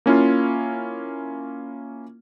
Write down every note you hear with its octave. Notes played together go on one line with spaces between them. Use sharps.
A#3 C#4 E4 F4